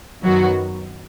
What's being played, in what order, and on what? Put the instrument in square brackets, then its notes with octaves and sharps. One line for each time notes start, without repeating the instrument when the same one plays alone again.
[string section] F#2 D#3 F#3 B3 F#4